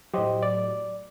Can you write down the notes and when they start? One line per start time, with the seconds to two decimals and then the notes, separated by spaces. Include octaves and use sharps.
0.14 A2 F#3 G4 C5 D#5
0.43 D5